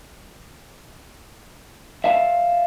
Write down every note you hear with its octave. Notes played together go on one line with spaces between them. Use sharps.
E5 F5 A5